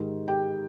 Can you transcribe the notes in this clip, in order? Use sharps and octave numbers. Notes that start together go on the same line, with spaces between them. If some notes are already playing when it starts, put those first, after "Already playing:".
Already playing: G#2 D#3 G#3 G4
G4 G5